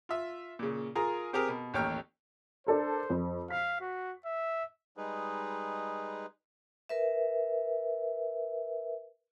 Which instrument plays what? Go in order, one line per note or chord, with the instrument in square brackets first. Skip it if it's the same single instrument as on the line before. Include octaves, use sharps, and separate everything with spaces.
[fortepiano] F4 E5
A#2 C#3
F4 G#4 A#4 A#5
C4 G4 G#4 A#4
B2
A1 D#2 C#5 G5 A#5 F6
[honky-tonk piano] D4 A4 A#4 [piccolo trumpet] C5
[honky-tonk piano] F2
[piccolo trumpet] F5 [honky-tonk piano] B6
[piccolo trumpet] F#4
E5
[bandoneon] G3 G#3 D#4 G#4 B4
[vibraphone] A#4 B4 E5